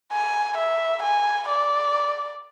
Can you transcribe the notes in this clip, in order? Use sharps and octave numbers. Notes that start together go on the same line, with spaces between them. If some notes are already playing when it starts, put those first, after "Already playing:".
G#5
E5
G#5
D5